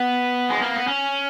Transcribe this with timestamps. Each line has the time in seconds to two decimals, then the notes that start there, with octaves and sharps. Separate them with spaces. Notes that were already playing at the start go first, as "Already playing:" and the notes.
Already playing: B3
0.50 G#3
0.62 A#3
0.75 B3
0.87 C#4